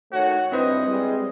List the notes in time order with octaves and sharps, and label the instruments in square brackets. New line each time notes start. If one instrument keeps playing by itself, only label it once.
[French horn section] D#3 A3 C#5 [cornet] F#4
[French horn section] G2 E4 [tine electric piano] C4 B4 C5 [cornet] D#5
[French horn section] G3 G#3